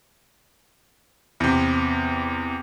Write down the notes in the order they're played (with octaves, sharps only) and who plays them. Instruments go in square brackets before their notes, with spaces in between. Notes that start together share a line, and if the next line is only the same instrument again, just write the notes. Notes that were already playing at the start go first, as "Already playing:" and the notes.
[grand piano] E2 C3